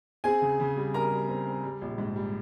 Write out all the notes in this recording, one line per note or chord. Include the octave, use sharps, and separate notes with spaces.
C4 G#4 G#5
C#3
C#3
G3
G3 A#4 A#5
G3
C4
C4
G3
A#1
G#2
G3